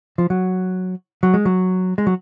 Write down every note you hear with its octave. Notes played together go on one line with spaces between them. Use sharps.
F3
F#3
F#3
G#3
F#3
G#3
F#3